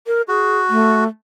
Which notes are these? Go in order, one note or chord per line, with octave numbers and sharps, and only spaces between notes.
A#4
F#4 G#4
A3